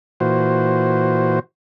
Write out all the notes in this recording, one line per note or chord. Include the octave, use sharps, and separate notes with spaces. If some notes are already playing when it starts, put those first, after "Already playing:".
A#2 E3 F#4 C5